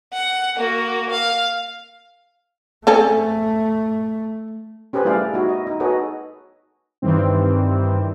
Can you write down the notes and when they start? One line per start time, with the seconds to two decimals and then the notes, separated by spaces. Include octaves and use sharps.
0.14 F#5
0.57 A#3 F#4
1.11 F5
2.87 A3 C4 C#4 A4
4.93 C#4 G4 G#4 B4 C5
5.05 G3 A3 E4 G#4 D5 F5
5.33 D#4 E4 F#4
5.49 D#5
5.67 D#4
5.80 F#4 G#4 A4 B4 C#5 D#5
7.02 G2 D#3 E3 G3 C4